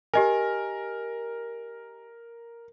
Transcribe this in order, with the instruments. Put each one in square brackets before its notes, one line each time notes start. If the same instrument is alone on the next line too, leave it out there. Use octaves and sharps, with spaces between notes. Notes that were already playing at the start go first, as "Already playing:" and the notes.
[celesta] G4 D#5 G#5 [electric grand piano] A#4